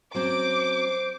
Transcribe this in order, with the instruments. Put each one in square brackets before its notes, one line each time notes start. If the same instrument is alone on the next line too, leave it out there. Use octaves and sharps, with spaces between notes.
[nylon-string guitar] F#3 C4 C#4 [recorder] C5 [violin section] D6